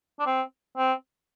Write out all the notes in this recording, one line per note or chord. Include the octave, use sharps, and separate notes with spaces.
D4
C4
C4